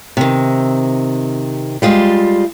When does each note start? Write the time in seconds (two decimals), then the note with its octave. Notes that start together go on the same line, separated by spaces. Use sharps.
0.17 C3 D#3
1.82 G3 G#3 F4